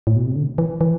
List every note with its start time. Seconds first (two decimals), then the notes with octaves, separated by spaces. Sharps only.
0.07 A2
0.16 B2
0.26 C3
0.36 D3
0.58 E3
0.81 E3